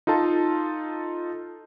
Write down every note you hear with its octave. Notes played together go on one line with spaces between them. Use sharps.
D#4 F4 A4 A5